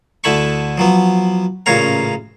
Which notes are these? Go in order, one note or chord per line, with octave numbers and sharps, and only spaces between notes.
D2 D3 E4 A5 B5 C#6
F3 F#3 B3
A1 A#2 C#3 C#5 F5 A#5